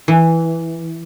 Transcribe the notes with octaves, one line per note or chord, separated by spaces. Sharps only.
E3